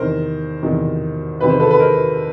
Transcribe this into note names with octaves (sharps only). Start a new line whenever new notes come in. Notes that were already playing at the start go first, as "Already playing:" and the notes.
Already playing: E2 C3 D#3 A#4 C5
E2 C3 D#3
E2 C3 D#3 B4
C5
A4 B4
B4
A#4 C5